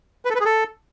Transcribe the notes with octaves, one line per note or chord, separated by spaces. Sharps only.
B4
A4
B4
G#4
A4